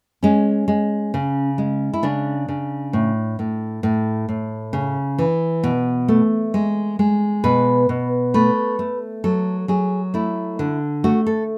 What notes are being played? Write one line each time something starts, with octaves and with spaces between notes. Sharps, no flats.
G#3 C#4
G#3
C#3
G#3
E4
C#3 D4
C#3
A2
A2
A2
A2
C#3
E3
B2
A3
G#3
G#3
B2 B4
B2
A3 B4
A3
F#3 A4
F#3 G#4
A3 E4
D3
A3 F#4
A4